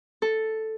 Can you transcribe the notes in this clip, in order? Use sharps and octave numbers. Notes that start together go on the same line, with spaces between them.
A4